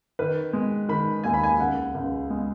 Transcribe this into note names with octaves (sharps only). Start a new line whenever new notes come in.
D#3 B4
G#3
D#3 B5
D#2 G#5
B5
G#5
C#2 F#5
C#2
G#3